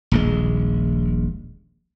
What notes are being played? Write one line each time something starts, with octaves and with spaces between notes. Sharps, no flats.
D#1 A#1 G#3